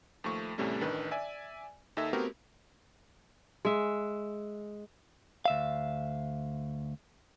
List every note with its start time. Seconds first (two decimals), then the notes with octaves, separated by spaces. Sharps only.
0.24 D#2 F3 A3 C#6
0.58 E2 A2 C3 G3 A3 C#4
0.81 A1 D#3 D4 B4
1.11 D5 E5 G#5
1.97 D#2 D#4 A4 E5 G#6
2.13 A3 B3 C4 F#4 G4 A#4
3.65 G#3 E5
5.46 D2 E5 F5